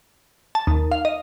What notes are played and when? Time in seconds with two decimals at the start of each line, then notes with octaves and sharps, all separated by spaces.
0.55 A5
0.67 D#2
0.91 F5
1.05 D#5